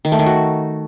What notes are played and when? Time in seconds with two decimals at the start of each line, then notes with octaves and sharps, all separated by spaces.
0.05 D#3
0.12 A3
0.19 D#3
0.26 F#4